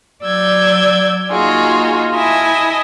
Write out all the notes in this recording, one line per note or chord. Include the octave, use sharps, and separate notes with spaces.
F#3 D5 E6 G6 G#6
A#3 D#4 F4 F#4 G#4
E4 D#5 G#5 A5